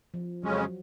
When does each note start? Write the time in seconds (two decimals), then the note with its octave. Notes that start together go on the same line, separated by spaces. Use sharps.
0.14 F3
0.44 F2 C#3 F#3 G#3 C#4